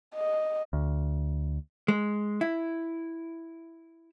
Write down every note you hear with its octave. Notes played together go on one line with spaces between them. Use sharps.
D#5
D2
G#3
E4